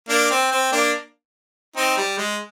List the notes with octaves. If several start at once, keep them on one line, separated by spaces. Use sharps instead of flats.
A#3 D4
C4
C4
A#3 D4
C4 D#4
G3
G#3